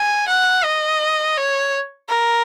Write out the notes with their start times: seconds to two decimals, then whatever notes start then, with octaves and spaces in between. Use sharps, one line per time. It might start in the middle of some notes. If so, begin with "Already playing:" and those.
Already playing: G#5
0.28 F#5
0.64 D#5
1.37 C#5
2.09 A#4